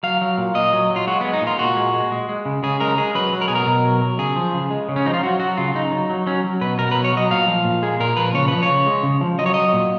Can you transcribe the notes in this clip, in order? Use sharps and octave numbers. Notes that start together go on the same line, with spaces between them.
F#3 F5
F#3
A#2
A#2 D#5
F#3
F#3
F4
G#3 F#4
G#3 B3
D#4
A#2
F4
A#2 F#4
G#3
G#3
G#3
G#3
C#3
C#3 G#4
G#3 A#4
G#3 G#4
F#3 B4
F#3
A#4
B2 G#4
A#4
B2
F#3
F#3
C#3 G#4
F3
C#3
G#3
C#3
C#4
F3 D#4
F4
F#3 F#4
F#3 F#4
C#3 F4
C#3 D#4
F#3
F#3
F#3 C#4
F#3
B2 B4
B2 A#4
F#3 B4
C#5
F#3 D#5
A#2 F5
F3
A#2
G#3 G#4
A#2 A#4
F3 B4
C#3 C#5
F3 B4
C#5
C#3
G#3
C#3
F3
F#3 D#5
C#5
F#3 D#5
A#2